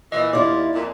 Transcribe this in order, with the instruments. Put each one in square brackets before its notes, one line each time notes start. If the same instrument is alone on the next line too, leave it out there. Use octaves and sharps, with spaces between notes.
[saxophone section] A#2 E3 [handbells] D#5
[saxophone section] D#2 F4 [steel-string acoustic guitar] E4 D5
[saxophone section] F2 A#2